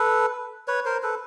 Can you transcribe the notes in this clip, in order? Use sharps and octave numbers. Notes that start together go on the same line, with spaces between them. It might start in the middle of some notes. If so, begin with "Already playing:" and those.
Already playing: A4 B4
B4 C#5
A#4 C5
A4 B4